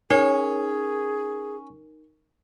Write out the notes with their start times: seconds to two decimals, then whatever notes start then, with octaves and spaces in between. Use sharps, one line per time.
0.10 C#4 D#4 G#4 A#4 C#5